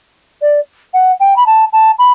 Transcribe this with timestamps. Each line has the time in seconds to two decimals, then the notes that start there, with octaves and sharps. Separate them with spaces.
0.41 D5
0.94 F#5
1.20 G5
1.36 B5
1.46 A5
1.73 A5
1.99 B5